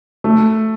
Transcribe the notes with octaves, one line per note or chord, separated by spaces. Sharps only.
A3